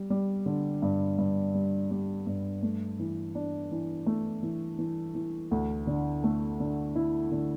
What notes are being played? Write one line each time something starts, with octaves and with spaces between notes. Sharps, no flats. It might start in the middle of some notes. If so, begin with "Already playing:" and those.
Already playing: G3
G3
D3
G2
G2
G3
G3
G2
A3
E3
D4
E3
A3
E3
E3
E3
D2
D3
A3
D3
E4
D3